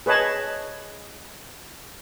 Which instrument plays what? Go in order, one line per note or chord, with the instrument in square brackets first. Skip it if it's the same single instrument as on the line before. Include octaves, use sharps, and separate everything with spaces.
[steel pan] G#4 B4 C#5 D#5 A5